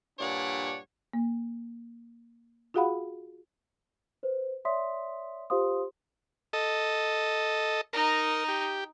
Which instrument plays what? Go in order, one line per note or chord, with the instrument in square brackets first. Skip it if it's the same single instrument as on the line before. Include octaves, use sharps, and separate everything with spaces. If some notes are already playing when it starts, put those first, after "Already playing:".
[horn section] G2 A#2 D4 C#5 D5 F#5
[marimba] A#3
F4 F#4 G#4 F5 F#5 B5
[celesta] B4 C5
C#5 D5 E5 C6 D#6 B6
F4 G4 C5 F5 C6 D#6
[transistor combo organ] A4 D#5
[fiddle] D#4 [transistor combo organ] A#4
[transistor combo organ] G4